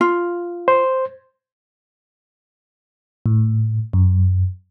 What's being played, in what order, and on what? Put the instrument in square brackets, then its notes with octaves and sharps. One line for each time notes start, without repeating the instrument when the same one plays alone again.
[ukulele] F4
[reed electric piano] C5
[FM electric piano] A2
F#2